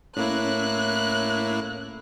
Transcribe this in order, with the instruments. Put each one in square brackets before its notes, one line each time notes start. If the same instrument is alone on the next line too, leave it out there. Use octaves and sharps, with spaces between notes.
[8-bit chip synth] A2 A#3 E4 [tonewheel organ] C#4 [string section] F#6